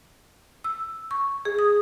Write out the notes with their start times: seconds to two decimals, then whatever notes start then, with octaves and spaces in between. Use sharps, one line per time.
0.64 E6
1.11 C#6
1.45 G#4
1.59 D#6